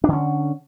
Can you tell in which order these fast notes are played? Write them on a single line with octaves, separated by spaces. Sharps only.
D4 D3 C#4